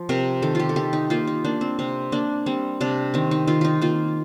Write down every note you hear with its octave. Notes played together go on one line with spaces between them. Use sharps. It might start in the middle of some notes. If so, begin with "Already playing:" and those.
Already playing: F3
C3 A#4
D#3 A4
F4 G4
A4
D#3 G4
D#4
A#3 F4
D#4
A#3 D4
C4
C3 C4
A#3 D4
G3 C4
C3 D4
D#3 C4
D#4
D#3 F4
D#4 F4
A#3 F4